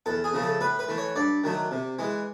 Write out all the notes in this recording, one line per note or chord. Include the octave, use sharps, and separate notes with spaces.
E2 A4
G#4
C#3 F3 A3
A4
A2 B4
B4
E3 A3
C#5
G2 D5
D#3 F#3 A3
C3
E3 G#3